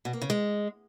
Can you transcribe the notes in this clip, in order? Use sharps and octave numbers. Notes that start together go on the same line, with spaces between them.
B2
A#3
C#3
G#3